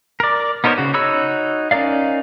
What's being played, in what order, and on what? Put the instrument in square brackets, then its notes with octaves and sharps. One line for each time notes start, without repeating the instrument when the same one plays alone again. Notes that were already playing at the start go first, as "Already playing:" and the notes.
[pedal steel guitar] A#4 D5
B3 D#4 A#4 C5 C#5
C#3 F#4
D#4 F#4 C#5 B5 E6
C#4 D#4 A#4 D5 F5